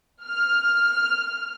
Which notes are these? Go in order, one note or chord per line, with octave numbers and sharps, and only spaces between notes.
F6